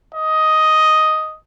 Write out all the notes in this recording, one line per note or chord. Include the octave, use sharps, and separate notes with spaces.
D#5